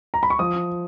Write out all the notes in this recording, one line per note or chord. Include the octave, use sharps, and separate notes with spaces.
A#5
B5
C#6
F3 D#6